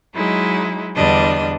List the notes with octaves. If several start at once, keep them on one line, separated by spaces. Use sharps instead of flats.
F#3 G#3 D#4 E4
E2 D3 G3 D4 D#5